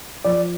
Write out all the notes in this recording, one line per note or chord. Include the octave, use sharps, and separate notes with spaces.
F3 D5